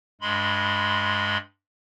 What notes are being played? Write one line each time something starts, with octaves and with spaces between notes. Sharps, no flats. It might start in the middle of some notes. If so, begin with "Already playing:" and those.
G2 G#3 B5 C6